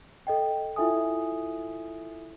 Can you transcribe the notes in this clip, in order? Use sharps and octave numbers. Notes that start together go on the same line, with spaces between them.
A4 D#5 G5
E4 F4 A4 E5 G#5 D#6